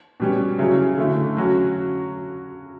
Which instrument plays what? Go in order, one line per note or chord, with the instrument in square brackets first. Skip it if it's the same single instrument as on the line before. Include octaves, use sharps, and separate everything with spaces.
[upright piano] B2 G3 C#4
C#3 F#3 C#4 E4
D3 A3 E4
F#3 C#4 F#4